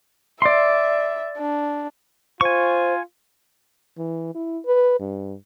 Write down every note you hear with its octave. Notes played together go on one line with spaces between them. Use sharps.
D5 E5 C6
D4
F4 C5 G#5 C#6
E3
E4
B4
G2